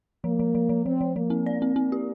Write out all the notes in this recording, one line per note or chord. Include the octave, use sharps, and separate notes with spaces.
F3 A#3
F3
F3
F3
F3 C4
F3
F3 A#3
C4
D5
C4
A#3 C4
G4